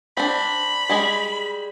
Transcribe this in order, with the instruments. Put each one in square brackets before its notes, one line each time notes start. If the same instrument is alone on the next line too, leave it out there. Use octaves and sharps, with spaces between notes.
[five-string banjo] C4 D4 [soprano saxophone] B5
[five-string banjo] G3 G#3 G#4